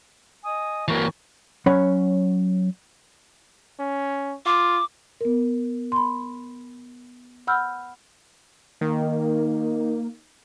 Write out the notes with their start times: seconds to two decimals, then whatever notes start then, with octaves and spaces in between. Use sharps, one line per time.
0.44 D#5 G#5 D#6
0.88 E3 A#3 F#4 C#6
1.66 F#3 C#4 C#5 F#5 B5
3.79 C#4
4.46 F4 D6
5.21 B3 A#4
5.92 B5 C6
7.47 F#5 B5 E6 F6 G6
8.81 D#3 A#3